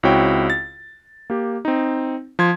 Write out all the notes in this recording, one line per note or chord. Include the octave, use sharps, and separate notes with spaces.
C#2 C4 E4 F#4 C#5 G5
A6
A#3 G4
C4 D#4
F3 C6 G#6